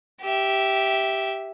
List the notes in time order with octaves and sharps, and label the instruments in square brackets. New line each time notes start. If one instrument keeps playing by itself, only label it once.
[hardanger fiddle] G4 E5